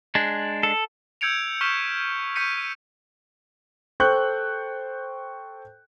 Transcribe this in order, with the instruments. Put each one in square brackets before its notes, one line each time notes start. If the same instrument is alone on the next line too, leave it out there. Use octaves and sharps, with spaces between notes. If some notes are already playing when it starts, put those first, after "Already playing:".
[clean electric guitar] G#3 D4
[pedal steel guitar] A4
[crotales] E6 G6 G#6 C#7 D7 F7
C#6 F6 G6 B6 E7
C#6 G6 B6 C#7 D#7
[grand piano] A4 C5 G5 C#6 F#6 G6